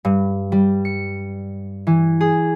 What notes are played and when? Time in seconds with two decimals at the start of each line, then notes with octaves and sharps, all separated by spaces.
0.05 G2
0.52 G3
0.85 C#7
1.87 E3
2.21 G#4